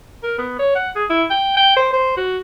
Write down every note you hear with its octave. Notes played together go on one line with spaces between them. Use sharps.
A#4
B3
C#5
F#5
G#4
E4
G5
G5
C5
C5
F#4